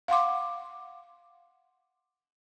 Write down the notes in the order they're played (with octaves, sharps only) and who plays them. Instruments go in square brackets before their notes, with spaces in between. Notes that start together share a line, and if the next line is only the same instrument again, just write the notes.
[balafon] F5 F#5 C6 D6